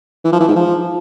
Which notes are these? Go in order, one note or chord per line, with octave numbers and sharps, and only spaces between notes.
E3
F3
E3
G#2
F3